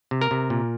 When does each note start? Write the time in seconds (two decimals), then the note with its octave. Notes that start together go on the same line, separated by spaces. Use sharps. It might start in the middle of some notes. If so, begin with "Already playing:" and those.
0.11 C3
0.21 A#4
0.31 C3
0.50 A#2